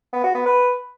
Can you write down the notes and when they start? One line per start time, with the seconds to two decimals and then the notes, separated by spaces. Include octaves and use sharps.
0.13 B3
0.24 F#4
0.35 B3
0.46 B4